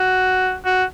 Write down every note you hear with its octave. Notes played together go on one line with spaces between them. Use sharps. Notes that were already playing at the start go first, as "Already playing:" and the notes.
Already playing: F#4
F#4